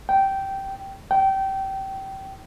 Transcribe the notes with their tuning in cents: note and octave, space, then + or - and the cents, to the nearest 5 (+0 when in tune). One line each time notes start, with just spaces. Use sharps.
G5 -10
G5 -20